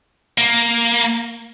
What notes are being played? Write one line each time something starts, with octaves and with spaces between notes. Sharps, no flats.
A#3